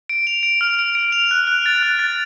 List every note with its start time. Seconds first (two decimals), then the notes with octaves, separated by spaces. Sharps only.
0.09 D7
0.27 F7
0.43 D7
0.61 F6
0.79 D7
0.95 D7
1.12 F7
1.31 F#6
1.47 F#6
1.66 A6
1.83 F#6
1.99 A6